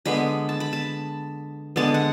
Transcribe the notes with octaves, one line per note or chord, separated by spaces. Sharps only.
D3 G#3 B3 B5
A5
B5
A5
D3 G#3 B3 A5
F#5